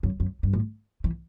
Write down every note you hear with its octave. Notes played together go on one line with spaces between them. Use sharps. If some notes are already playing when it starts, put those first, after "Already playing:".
F#2
F#2
G2
A2
E3